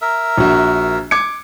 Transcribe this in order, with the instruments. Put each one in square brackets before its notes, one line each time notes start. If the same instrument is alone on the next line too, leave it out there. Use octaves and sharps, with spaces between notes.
[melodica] A#4 E5
[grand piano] A#1 F#4
D6 G#6 C#7